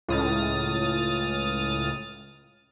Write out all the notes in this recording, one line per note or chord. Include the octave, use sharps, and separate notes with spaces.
C#2 A2 D#6 F6 A6